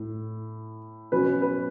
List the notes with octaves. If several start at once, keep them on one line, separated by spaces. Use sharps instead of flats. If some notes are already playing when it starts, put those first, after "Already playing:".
Already playing: A2
B2 F#3 C#4 B4
B4